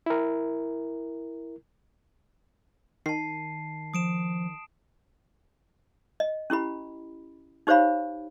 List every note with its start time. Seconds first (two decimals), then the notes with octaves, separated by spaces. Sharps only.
0.06 E4 A#4
3.06 D#3 A5 C7
3.94 F3 D#6 D7 E7
6.20 D#5
6.50 C#4 E4 G4 B5
7.67 D#4 G4 C5 C#5 F5 B5